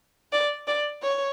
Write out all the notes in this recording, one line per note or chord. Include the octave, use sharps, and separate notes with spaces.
D5
D5
C#5